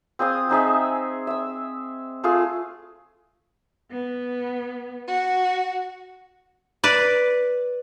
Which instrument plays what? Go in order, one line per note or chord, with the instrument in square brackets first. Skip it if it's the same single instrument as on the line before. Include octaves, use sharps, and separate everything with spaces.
[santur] C4 G#4 F5 D#6
C4 D#4 G#4 E5
E5 E6
A3 F4 G#4
[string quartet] B3
F#4
[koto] B4 D5